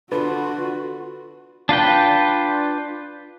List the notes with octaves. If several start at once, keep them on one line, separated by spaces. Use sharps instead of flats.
D3 F4 F#4 B4
D4 F4 B4 G5